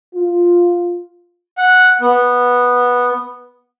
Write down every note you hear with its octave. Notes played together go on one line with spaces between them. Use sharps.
F4
F#5
B3